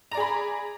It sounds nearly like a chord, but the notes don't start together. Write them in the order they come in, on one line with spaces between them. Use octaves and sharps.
A#5 D5 G#4 B5